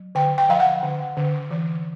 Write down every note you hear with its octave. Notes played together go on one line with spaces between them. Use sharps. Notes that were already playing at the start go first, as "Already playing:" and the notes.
Already playing: F#3
D3 G5
G5
F3 F5
F#5
D3
D3
E3